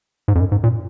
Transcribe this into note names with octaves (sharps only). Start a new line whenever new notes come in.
G#2
F2
F#2
G#2
A#2